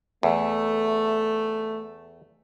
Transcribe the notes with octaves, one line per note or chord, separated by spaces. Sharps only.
E2 A3